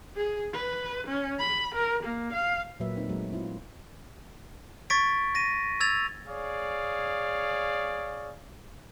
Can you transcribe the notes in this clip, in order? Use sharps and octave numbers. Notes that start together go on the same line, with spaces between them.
G#4
B4
C#4
B5
A#4
A#3
F5
A#2 F#3 A#3 B4 E5
C4 D#4 B4
F#3 G#3 A3
C4 E4 F4
C#6 G#6 A6 B6 D7
A#6 D#7
E6 G#6 A6 F7
G#4 C#5 D5 F5